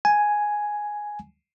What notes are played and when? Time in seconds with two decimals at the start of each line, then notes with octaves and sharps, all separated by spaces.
0.05 G#5